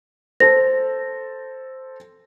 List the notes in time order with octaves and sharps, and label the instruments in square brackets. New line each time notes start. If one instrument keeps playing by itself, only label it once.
[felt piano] A4 C5 [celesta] A#6